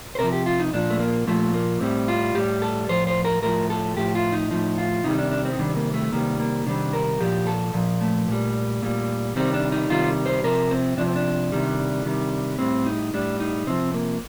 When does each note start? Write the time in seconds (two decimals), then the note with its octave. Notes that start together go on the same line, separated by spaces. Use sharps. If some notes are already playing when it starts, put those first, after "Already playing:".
0.15 C5
0.19 C3 F3 A#4
0.33 G4
0.46 F4
0.60 D#4
0.73 A#2 F3 D4
0.90 A3
1.00 A#3
1.27 A#2 F3 A3
1.54 A#3
1.81 A2 G3 C4
2.08 F4
2.35 A2 G3 G4
2.62 A4
2.89 A2 F3 C5
3.07 C5
3.25 A#4
3.42 A2 F3 A#4
3.70 A4
3.97 A2 F3 G4
4.15 F4
4.33 D#4
4.51 A2 F3 D#4
4.78 F4
5.04 C3 D#3 G3 D#4
5.18 D4
5.31 D4
5.45 C4
5.53 D#4
5.59 C3 D#3 G3 D4
5.76 A#3
5.94 A3
6.12 C3 D#3 G3 A#3
6.40 A#3
6.66 C3 D#3 G3 D4
6.93 A#4
7.20 A#2 F3 G4
7.47 A4
7.74 A#2 F3
8.01 A3
8.28 A#2 G3
8.82 A#2 G3
9.36 C3 D#3 G3 C4
9.54 D4
9.72 D#4
9.90 C3 D#3 G3 F4
10.26 C5
10.44 C3 F3 A#4
10.71 C4
10.97 C3 F3 D4
11.06 C4
11.16 D4
11.52 C3 D#3 G3
12.05 C3 D#3 G3
12.59 A2 G3 C4
12.86 D#4
13.13 A2 G3 D4
13.40 D#4
13.67 C3 F3 C4
13.94 A#3